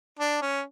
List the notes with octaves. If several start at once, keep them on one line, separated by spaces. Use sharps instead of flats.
D4
C#4